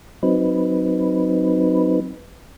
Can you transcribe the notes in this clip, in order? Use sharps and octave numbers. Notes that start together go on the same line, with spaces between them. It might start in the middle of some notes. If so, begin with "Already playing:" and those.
F#3 C4 D#4 B4